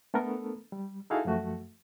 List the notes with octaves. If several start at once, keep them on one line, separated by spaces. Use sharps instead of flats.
A3 B3 D4 A4 A#4
G3
D#4 E4 F#4 G#4 A4 F5
F#2 F3 A3 F#4